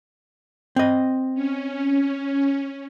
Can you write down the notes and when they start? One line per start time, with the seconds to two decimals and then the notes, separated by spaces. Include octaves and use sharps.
0.76 C4 D#5
1.34 C#4